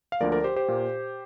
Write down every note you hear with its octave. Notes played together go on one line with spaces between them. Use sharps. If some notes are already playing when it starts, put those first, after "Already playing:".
F5
D2 D3 F3 A#3 A#4 D5
A#4 D5
G4 C5
G4 C5
A#2 A#3